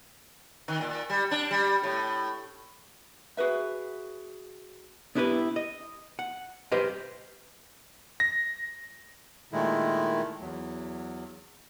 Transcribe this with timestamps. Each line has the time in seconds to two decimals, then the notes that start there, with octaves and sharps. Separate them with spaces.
0.68 D#3
0.81 A#2
1.10 G3
1.31 D4
1.51 G3
1.83 A2
3.37 F#4 G#4 B4 E5
5.15 B3 D4 E4 G4 A#4 B4
5.56 D#5
6.19 F#5
6.72 G4 B4 C5 D#5 F5
8.20 A#6
9.53 A#2 D#3 G#3 A3 E4
10.41 E2 F#3